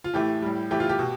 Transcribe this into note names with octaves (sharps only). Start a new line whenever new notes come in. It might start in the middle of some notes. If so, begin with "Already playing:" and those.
F4
A2 E3 A3 G4
A2 G3
A2 E3 A3 G4
F4
G4
B2